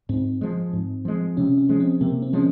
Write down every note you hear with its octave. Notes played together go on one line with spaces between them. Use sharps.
G#2 C4
F3 G#3
G#2
F3 G#3
C3 C#4
C#4
F3 G#3
C4
C3 A#3
C4
F3 G#3 C#4